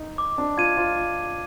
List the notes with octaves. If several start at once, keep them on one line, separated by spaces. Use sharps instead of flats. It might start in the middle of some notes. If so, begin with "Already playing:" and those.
Already playing: D#4
D6
D4
F4 G#6 D#7
F4
D6